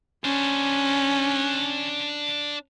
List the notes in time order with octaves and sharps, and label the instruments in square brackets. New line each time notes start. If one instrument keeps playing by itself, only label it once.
[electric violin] C#4 [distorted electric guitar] D4 C5